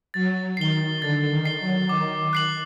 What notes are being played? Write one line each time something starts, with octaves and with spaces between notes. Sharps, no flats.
F#3 A6
D#3 C7 G7
D3 A6
D#3
C7 G7
F#3
D#3 D6
F#6 C7 F#7